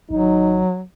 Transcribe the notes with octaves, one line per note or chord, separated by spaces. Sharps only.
G#1 F#3 D#4